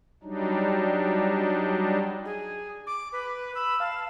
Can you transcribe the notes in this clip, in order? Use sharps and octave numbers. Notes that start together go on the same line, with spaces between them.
F#3 G3 D4 D#4
G#4
D6
B4
B5 E6
F5 A5